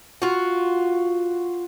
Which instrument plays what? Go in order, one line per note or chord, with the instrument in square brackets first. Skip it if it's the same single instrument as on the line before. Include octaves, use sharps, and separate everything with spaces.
[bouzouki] F4 F#4